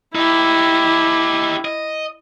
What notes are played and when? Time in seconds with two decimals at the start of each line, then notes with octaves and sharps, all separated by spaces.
0.15 D#4 E4 G4
1.65 D#5